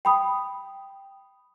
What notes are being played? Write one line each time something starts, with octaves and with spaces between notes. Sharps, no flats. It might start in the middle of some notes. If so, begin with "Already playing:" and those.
G5 B5 D#6